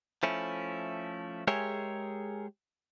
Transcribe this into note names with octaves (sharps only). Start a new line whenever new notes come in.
F3 A3 C#4 E4
G#3 G4 G#4 A#4 C#5 E5